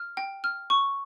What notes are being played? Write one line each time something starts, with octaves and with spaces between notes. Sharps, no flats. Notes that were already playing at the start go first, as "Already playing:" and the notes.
Already playing: F6
G5
F6
C#6